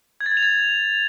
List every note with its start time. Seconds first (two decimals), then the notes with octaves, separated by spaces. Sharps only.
0.21 G#6
0.26 A6
0.32 G#6
0.37 F7
0.43 A6